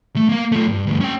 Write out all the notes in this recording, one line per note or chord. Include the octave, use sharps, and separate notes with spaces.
A3
A#3 F5
A3 F4
G2
D2 G2
C#4 G5